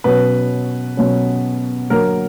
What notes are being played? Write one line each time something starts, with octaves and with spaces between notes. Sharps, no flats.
B2 F#3 C#4 B4
B2 F#3 C#4
D3 F#3 A#3 A#4